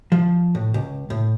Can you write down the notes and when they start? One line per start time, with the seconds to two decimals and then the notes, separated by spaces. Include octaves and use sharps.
0.12 F3
0.55 A2
0.74 C#2
1.10 A2